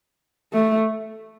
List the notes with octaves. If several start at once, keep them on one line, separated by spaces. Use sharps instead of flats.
A3